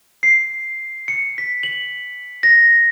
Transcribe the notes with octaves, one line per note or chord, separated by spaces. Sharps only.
C7
C#7
B6
F#7
A#6